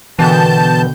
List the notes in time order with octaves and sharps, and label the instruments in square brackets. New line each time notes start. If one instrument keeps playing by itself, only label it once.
[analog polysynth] B2 G6 [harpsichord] D3 A#3 C4 [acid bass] E3 [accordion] A5